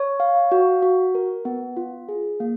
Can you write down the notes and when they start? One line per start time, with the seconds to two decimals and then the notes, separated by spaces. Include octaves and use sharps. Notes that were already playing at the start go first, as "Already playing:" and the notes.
Already playing: C#5
0.20 F5
0.52 F#4
0.82 F#4
1.15 A#4
1.45 B3
1.77 F4
2.09 G#4
2.40 A#3